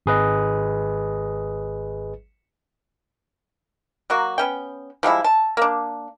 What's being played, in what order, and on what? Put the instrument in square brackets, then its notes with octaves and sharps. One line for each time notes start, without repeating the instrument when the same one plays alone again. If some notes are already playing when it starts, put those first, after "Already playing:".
[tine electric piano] G#1 G#4 B4 D#5
[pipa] F#3 A#3 F#4
B3 C#4 G5
F3 G3 G#3 E4
A5
A#3 D4